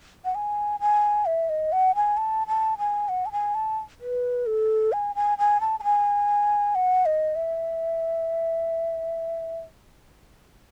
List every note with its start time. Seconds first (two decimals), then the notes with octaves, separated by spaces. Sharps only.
0.25 F#5
0.35 G#5
0.80 G#5
1.26 E5
1.49 D#5
1.72 F#5
1.95 G#5
2.17 A5
2.48 A5
2.78 G#5
3.09 F#5
3.26 A5
3.32 G#5
3.55 A5
4.01 B4
4.46 A4
4.92 G#5
5.16 G#5
5.38 G#5
5.61 A5
5.80 A5
5.84 G#5
6.75 F#5
7.06 D#5
7.36 E5